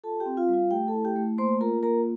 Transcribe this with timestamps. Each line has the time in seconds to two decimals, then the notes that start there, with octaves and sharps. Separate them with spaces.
0.04 F4 A4 A5
0.20 G4 G5
0.26 C4
0.37 F4 F5
0.49 G3
0.54 F4 F5
0.71 A3 G4 G5
0.87 A4 A5
0.94 E4
1.05 G4 G5
1.16 A3
1.38 A#3 C5 C6
1.61 F4 A#4 A#5
1.83 A#3 A#4 A#5